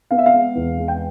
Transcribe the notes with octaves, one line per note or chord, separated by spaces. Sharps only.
B3 F5
E5
F5
G#3
E2
G#3
G5